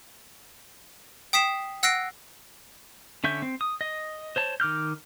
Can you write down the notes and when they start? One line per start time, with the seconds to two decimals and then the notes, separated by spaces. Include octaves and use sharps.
1.33 G5 D#6 B6 C7 E7
1.83 F#5 E6 F#6 A#6 C7 D7
3.24 D3 C#4 E5 C#6 G6
3.42 C4
3.61 D#6
3.81 D#5
4.36 C5 C#5 A5
4.60 D#3 D6 F6 G6